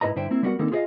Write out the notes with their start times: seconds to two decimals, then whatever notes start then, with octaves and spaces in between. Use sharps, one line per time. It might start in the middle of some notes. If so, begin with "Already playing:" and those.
0.01 G#2 E4 B4 D#5 A#5
0.16 G2 D3 E4 C5 G5
0.31 A#3 C4 E4
0.43 G3 B3 E4 F#4 A#4 F#5
0.59 D3 D#3 A#3 C4 D#4 A4
0.72 F4 G#4 C5 D5 D#5 F5